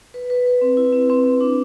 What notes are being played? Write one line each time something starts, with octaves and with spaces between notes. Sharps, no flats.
B4
B4
B4
C4
E4
C4
C4
C4
D4